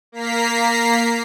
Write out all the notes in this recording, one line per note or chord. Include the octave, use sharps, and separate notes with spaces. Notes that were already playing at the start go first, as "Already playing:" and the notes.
A#3 A#5 B6 C7